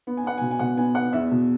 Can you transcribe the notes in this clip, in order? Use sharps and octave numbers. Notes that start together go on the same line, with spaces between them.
B3
G#5
B3 F#5
B2 G#5
G#5
B2 F#5
B3 G#5
B3 F#5
E2 E5
B2